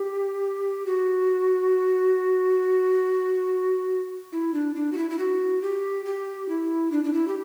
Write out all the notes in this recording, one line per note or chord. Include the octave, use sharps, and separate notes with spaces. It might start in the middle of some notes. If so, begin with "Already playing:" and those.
Already playing: G4
F#4
E4
D4
D4
F#4
E4
E4
F#4
G4
G4
E4
D4
D4
E4
G4